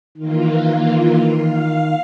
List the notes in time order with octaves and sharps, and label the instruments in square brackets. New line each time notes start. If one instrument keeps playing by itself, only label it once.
[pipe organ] D#3 [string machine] E3 A#3 F4
[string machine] F5